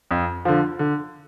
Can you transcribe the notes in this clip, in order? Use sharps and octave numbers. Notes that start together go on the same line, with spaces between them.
F2
D3 F3
D3